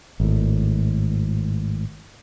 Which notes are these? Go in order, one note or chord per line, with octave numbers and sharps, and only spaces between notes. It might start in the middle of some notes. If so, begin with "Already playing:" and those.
G#1 A2